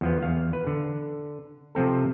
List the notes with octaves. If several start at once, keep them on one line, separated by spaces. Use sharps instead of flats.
E2 F3 B3
E2 F5
B4
D3
C3 F3 C4 A4